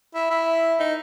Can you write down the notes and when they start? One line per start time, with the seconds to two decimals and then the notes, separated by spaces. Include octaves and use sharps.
0.15 E4
0.30 E4
0.80 D#4